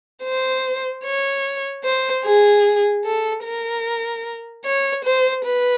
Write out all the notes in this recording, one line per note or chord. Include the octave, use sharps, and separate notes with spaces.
C5
C#5
C5
G#4
A4
A#4
C#5
C5
B4